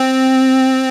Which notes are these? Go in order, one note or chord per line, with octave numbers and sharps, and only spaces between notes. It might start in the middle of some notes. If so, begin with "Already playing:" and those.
Already playing: C4